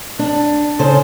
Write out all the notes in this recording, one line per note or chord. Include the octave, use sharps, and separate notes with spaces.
D4
C#3 A4 C5